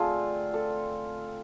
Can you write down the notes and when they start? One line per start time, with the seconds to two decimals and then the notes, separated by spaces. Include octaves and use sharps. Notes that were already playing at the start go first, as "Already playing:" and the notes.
Already playing: D3 A3 C4 F4 G#4
0.54 A4